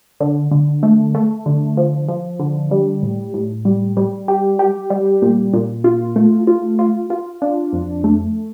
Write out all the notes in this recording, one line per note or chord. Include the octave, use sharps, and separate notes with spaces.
D3
D3
A3
A3
D3
F3
F3
D3
G3
A2
A2
G3
G3
G4
G4
G3
A#2
A#2
F4
A3
F4
F4
F4
D4
F2
A3